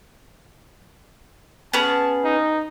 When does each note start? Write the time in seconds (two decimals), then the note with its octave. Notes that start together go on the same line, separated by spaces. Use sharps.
1.73 B3 C#4 G#4 A5
2.24 D#4